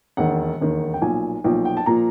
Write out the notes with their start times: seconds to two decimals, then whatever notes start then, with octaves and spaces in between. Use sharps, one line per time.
0.17 E1 D#2 D#3 F#5
0.60 E1 D#2 D#3
0.94 G5
1.02 B1 A#2 F3 G#5
1.44 B1 A#2 F3 G5
1.65 G5
1.77 A5
1.86 A#2 F3 A#5